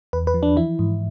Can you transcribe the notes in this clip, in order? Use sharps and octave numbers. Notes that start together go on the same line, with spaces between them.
E2 B4
B4
F3
D4
E3 E4
G#2